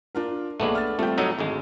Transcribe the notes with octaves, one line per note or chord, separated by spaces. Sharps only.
D4 F4 A#4
A#1 G#3 A3 B3 D4 G#4
F6 A6
G3 A3 C4 F4 G5
A2 F#3 D#4 E6 D#7
G#1 D2 G#3